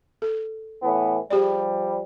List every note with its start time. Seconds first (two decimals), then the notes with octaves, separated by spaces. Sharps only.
0.22 A4
0.82 A2 E3 B3
1.30 F3 G3 G4 G#4 D5